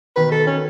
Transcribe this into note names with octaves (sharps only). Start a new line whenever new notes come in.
B2 D#3 B4
A4
C#4